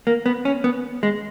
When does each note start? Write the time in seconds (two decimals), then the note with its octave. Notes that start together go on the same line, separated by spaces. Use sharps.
0.07 A#3
0.26 B3
0.45 C#4
0.64 B3
1.03 G#3